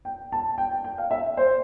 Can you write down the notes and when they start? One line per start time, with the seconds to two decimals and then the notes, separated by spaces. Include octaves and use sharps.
0.05 G5
0.32 A5
0.58 G5
0.71 G5
0.84 G5
0.98 F5
1.11 E5
1.37 C5